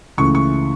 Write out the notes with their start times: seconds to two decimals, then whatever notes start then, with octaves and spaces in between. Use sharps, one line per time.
0.18 C#2 C#3 E3 A3 C#6
0.35 C#6